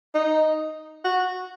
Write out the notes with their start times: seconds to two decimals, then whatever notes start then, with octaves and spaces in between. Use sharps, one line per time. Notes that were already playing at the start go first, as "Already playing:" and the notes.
0.14 D#4
1.04 F#4